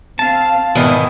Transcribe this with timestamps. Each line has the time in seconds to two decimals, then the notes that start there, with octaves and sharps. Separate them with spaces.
0.19 C4 F5 A5
0.75 E2 G#2 B2 D#3 E3